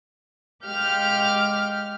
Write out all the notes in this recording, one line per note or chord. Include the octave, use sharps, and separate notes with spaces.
G#3 G4 F5 F6 G6